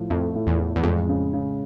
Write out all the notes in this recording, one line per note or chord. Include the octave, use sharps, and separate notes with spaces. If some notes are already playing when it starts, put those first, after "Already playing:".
Already playing: A2 F3 A3
F2 A3
A2
E2
A2
E2
F2 G#3
C#3
C#3